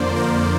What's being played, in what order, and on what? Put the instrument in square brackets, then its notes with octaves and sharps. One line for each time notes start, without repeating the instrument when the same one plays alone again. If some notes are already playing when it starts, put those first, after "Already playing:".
Already playing: [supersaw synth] F2 D3 F3 A#3 C5 D5
A#4